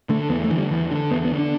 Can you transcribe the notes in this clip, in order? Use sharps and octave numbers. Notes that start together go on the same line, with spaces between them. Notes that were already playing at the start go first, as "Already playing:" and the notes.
D3 A3
E2 B3
A3
D3 E3
G3
E2 E3
D3
E2 B3
B3
D3
D4